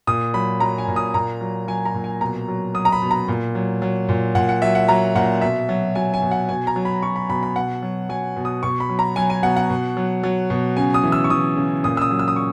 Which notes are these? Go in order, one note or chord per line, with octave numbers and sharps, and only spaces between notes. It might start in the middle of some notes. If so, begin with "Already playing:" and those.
A#2 D#6
F#3 B5
F#3 A#5
G#5
A#2
D#6
A#2 A#5
F#3
F#3 G#5
A#5
A#2
G#5
B2 A#5
F#3
F#3 D#6
A#5
B5
B2
A#5
A#2
F#3
F#3
A#2
A#2 F#5
F#5
F#3 E5
F#5
F#3 A#5
A#2 F#5
B2 E5
F#3
F#3 G#5
G#5
B2
F#5
B2 G#5
A#5
F#3
B5
F#3 C#6
B5
B2 B5
B5
B2 F#5
F#3
F#3 G#5
B2
D#6
B2 C#6
B5
F#3
A#5
F#3 G#5
G#5
B2 F#5
F#5
B2
F#3
F#3
B2
C#3 G#5
D#6
E3
E6
C#6
E3 D#6
C#3
A#2 D#6
E6
D#6
F#3
E6
D#6
C#6